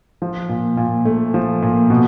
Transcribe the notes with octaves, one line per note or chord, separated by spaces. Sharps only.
F3
A#2
A#2
A3
F3
A#2
B2